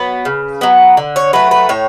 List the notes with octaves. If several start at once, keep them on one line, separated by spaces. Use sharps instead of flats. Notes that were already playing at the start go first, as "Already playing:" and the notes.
Already playing: F#3 B3 B4
C#3
F#3 B3
D3
C#5
F#3 A3 B4
B4
A2 C#5